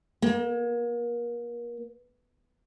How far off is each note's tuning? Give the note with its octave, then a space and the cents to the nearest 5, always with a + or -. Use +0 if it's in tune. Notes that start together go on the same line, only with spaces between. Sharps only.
A#3 +35